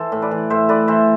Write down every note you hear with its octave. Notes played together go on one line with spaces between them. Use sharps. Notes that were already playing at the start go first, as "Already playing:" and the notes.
Already playing: E3 A4 C5
A2
B4 D5
E3
A2 C5 E5
A2 B4 D5
E3 C5 E5